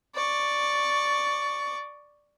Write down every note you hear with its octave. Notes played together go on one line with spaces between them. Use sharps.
D5 C#6